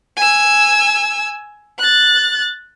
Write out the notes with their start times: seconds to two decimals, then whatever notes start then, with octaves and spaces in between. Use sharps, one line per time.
0.17 G#5 E6
1.79 F#6 A6